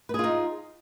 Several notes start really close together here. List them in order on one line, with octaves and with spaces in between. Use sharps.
B4 G#4 F4 D#4